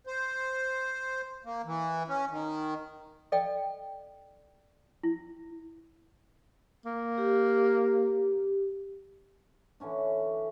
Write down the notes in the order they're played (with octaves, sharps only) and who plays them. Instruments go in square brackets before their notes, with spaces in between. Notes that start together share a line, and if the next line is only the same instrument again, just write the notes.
[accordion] C5
A#3
E3
C#4
D#3
[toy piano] A4 D5 D#5 F5 G5
E4
[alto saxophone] A#3
[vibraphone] G4
[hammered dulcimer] D3 E3 C#4 D4